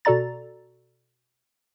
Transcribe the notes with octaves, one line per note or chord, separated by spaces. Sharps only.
B2 F#4 A4 D5 A#5 A6